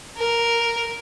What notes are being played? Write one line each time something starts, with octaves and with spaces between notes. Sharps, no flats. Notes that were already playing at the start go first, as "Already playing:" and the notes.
A#4